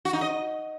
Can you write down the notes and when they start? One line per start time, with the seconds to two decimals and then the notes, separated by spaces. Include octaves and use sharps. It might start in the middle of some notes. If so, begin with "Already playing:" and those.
0.05 F#4
0.13 D#4
0.21 D#5